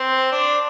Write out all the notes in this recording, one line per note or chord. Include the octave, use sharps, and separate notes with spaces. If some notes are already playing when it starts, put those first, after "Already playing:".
Already playing: C4
D4